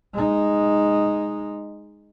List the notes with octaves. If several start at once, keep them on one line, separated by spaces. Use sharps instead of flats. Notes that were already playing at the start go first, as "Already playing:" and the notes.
G#3 D#4